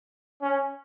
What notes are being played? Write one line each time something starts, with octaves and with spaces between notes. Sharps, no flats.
C#4